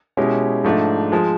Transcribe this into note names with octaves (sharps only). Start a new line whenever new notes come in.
B2 G#3 C#4 E4 G4
G#2 F3 A3 D4
F3 G#3